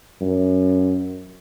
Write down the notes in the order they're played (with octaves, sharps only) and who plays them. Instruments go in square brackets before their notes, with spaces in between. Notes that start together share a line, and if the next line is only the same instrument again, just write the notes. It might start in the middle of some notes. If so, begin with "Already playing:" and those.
[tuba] F#2